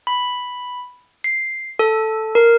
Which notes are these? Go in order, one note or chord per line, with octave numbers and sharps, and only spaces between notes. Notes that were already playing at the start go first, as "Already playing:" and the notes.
B5
C7
A4
A#4